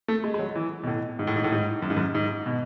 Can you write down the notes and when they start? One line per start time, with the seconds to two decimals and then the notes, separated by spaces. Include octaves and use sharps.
0.08 A3
0.24 G#3
0.34 G#3
0.39 F#3
0.55 E3
0.83 B2
0.87 A2
1.19 G#2
1.27 A2
1.36 G#2
1.44 A2
1.52 G#2
1.82 F#2
1.90 G#2
1.96 F#2
2.15 G#2
2.46 B2